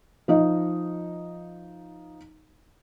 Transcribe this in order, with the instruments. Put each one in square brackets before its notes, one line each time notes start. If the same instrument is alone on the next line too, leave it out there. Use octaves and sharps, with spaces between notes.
[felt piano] F3 D#4 D#5